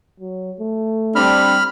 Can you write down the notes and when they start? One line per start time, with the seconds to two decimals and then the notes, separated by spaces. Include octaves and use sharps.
0.20 F#3
0.61 A3
1.16 G3 C4 D4 B5 F6